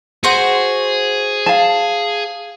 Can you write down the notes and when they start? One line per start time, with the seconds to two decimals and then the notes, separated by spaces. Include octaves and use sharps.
0.24 F#4 G#4 C5
1.46 F5 A5